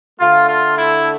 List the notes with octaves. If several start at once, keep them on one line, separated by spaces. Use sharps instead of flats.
D3 A3 F4
F4
E4